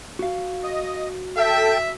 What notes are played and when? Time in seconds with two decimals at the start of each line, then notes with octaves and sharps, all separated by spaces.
0.19 F#4 F5
0.63 D#5
1.37 A4 E5 G5